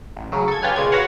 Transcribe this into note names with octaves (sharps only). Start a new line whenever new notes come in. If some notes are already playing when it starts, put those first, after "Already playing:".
A1
C#3 F#3
A4 G#6
F4 G4 B4 C#5 G#5
A#2 C#3 G#3 G#6
F#4 B4 C#5 F5 F#5